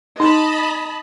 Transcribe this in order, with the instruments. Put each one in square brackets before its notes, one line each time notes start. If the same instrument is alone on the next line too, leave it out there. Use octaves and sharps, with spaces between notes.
[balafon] D#4 [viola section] D#5 A5 B5